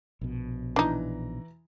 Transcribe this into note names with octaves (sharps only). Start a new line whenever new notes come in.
A#1 B2
E3 D4 D#4 A#5